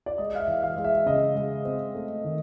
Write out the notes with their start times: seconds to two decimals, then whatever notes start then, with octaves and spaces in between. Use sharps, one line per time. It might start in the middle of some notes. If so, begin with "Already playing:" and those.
0.06 D5
0.18 G#3 D#5
0.35 F5
0.40 E5
0.48 E3
0.63 F5
0.77 G#3
0.84 E5
1.06 C#3 D#5
1.36 G#3
1.65 C4
1.95 A3
2.24 D#3